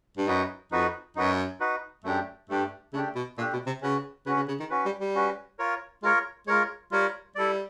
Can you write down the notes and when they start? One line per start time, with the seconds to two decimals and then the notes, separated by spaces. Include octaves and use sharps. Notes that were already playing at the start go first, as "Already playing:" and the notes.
0.17 G2
0.27 F#2 D#4 F#4 B4
0.72 F2 D#4 F#4 B4
1.16 F#2 D#4 F#4 B4
1.60 D#4 F#4 B4
2.04 F#2 A3 D4 G4
2.49 G2 A3 D4 G4
2.93 C#3 A3 D4 G4
3.15 B2
3.38 A#2 A3 D4 G4
3.53 B2
3.66 C3
3.82 C#3 C#4 F#4 B4
4.26 C#3 C#4 F#4 B4
4.37 C#3
4.48 C#3
4.60 D#3
4.70 C#4 F#4 B4
4.85 G3
4.99 G3
5.15 C#4 F#4 B4
5.59 F4 A#4 C#5
6.02 G#3 F4 A#4 C#5
6.47 G#3 F4 A#4 C#5
6.91 G3 F4 A#4 C#5
7.35 G3 E4 A4 D5